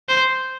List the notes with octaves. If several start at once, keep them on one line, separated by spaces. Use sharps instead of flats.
C5